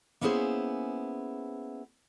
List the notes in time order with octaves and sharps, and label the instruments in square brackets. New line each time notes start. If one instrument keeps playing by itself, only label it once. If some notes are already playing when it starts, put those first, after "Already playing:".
[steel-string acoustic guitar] A#3 B3 C#4 E4 G#4 C5